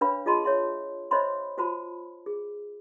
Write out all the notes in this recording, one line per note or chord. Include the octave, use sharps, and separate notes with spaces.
D4 B4 C#5 F5 B5
F4 G#4 D#5 A5 B5 C6
C#5 E5 C6
C5 C#5 D#5 E5 B5 C6
F4 F#4 C5 A5 B5
G#4